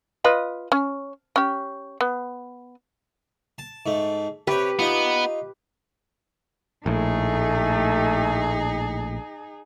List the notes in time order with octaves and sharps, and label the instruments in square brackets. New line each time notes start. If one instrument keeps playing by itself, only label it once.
[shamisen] F4 B4 D#5
C#4
C#4 G4
B3
[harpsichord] A5
G#2 A3
[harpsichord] C3 C#5 [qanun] G4 B4
[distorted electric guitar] B3 [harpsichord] D#4 F4
[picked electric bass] A#1 A2 [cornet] A3 [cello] D#4 G#4